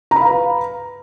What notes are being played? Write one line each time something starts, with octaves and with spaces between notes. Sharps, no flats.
B4 F5 A#5 B5